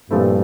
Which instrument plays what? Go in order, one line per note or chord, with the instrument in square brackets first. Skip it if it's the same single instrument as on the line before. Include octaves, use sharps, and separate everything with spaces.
[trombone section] G2 [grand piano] A#2 F3 A3 C4 E4